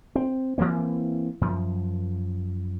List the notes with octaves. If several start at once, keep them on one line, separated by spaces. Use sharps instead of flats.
C4
E3 F#3 A#3 C4
F#2 F3